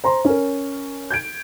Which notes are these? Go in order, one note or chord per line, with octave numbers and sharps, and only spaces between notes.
C5 A#5 C6
C#4 A#4
G6 G#6 D7